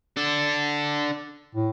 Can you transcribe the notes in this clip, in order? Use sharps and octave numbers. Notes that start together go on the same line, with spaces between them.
D4 A4
A2